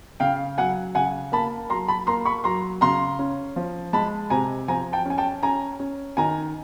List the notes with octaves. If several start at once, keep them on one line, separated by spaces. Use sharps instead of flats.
C#3 F5 G5
F#3 F#5 G#5
C#3 F#5 G#5
A#3 A5 B5
F#3 A#5 C6
A5 B5
A#3 A#5 C6
B5 C#6
F#3 A#5 C6
C#3 A#5 C6
C#4
F3
G#3 A5 B5
C3 G#5 A#5
F3 G#5 A#5
G5 A5
C#4 G#5
G5 A5
C#4 G#5 A#5
C#4
D#3 G#5 A#5